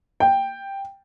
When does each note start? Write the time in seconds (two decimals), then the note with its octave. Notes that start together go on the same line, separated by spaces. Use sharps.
0.20 G5